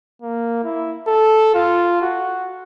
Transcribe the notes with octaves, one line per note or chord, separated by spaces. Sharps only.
A#3
E4
A4
F4
F#4